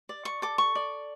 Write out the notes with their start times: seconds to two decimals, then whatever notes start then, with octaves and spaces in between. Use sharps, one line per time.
0.09 D5
0.25 C#6
0.42 A4 D6
0.58 C#6
0.75 D5